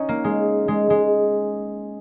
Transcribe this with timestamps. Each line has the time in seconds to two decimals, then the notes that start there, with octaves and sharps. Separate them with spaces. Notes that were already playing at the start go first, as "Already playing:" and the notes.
Already playing: C#4 D#4
0.09 A#3
0.24 G#3
0.68 G#3
0.90 G#3